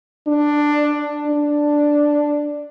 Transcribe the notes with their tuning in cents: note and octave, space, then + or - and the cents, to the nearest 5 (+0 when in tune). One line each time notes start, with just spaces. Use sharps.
D4 +10
D4 +5